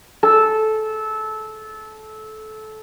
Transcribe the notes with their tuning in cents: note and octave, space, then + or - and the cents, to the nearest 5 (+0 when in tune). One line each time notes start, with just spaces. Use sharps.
A4 -20